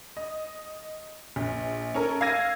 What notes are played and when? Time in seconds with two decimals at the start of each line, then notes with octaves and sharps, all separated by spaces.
0.17 D#5
1.36 A#1
1.94 C#4 A4 A#4
2.21 F5 E6 G#6 A#6 D#7